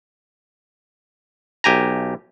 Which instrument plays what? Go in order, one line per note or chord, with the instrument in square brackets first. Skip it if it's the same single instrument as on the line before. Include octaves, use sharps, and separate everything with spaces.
[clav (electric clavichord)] B1 G4 G#5 A#5